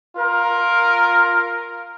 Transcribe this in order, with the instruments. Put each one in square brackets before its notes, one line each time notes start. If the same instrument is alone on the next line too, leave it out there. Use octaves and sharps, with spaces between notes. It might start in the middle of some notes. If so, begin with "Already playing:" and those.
[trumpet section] F4 A#4